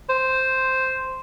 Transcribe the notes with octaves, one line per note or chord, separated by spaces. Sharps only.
C5